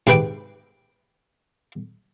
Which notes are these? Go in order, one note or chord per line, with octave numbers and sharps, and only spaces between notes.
G#2 C3 B4 G5 D6